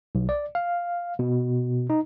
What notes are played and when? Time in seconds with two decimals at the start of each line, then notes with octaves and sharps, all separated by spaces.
0.15 B1
0.29 D5
0.55 F5
1.19 B2
1.90 D#4